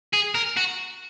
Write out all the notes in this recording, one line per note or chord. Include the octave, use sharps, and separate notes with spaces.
G#4
A#4
F#4